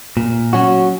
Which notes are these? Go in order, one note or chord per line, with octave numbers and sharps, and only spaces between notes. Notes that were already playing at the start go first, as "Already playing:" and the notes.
A#2
F#3 C#4 F#4